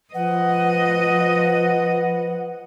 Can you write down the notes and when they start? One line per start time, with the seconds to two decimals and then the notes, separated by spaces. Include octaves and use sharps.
0.14 F3 B4 D#5 F#5